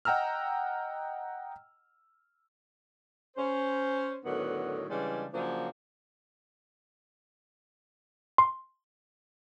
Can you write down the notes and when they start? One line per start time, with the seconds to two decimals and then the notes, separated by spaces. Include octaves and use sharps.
0.05 D#5 F#5 G5 A#5 E6 F6
3.37 C#4 C5
4.25 A2 D3 D#3 F#3 B3
4.90 C#3 E3 G3 G#3 D4
5.33 C#3 F3 F#3 A#3 D4
8.38 C6